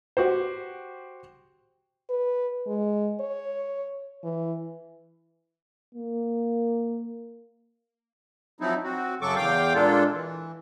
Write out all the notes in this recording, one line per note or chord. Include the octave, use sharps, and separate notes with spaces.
F#4 G4 C5
B4
G#3
C#5
E3
A#3
F3 F#3 C4 D#4 E4
C4 F#4
F#2 C#3 F#3 A4 C#6 D6
E2 F5 G5 D6
A#2 G#3 A#3 D4 F4 A4
E3